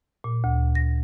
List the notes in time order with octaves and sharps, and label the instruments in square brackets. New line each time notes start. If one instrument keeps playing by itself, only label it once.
[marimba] A#2
D2
A#6